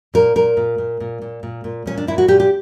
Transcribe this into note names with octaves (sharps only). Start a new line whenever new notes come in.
A#2 A#4
A#2 A#4
A#2
A#2
A#2
A#2
A#2
A#2
A#2 C#4
D4
A#2 E4
F#4
A#2 G4
G4